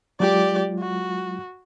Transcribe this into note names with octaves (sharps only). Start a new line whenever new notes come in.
F#3 G#3 F4 G4 D5
F#4